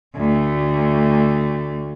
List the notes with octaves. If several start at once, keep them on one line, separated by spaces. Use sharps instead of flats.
D2 A3